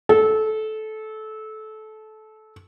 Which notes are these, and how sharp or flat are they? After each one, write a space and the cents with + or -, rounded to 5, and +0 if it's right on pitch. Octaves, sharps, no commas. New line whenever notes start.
A4 -20